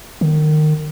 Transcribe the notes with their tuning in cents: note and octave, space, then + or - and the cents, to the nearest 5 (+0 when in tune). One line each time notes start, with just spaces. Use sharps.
D#3 -25